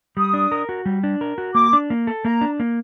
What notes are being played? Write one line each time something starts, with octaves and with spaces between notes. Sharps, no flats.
G3 D#6
D4
A#4
F#4
G3
D4
A#4
F#4
A#3 D6
D4
A#3
A4
A#3 A#5
D4
A#3